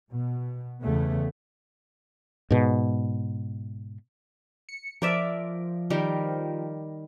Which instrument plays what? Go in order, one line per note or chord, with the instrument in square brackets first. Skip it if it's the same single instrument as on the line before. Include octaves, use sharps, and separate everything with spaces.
[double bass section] B2
E2 C#3 A3 B3
[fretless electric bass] G#2 B2
[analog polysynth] C#7
[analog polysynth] F3 [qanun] A#4 D5 E5
[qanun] D#3 G3 A#4